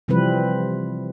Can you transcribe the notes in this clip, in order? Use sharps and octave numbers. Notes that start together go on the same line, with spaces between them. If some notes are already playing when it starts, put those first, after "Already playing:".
C3 E3 F3 G3 C4 B4